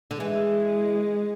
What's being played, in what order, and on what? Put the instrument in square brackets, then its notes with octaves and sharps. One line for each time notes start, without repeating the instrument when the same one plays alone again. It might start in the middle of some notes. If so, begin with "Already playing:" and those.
[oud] D3
[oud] E3 [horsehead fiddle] G#3